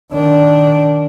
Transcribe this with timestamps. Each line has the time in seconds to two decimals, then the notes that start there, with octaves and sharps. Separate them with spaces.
0.12 D#3 D4